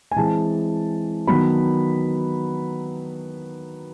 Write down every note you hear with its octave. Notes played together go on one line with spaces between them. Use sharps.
G#5
E3 G#3 C4 A5
D#3 F#3 B3 B5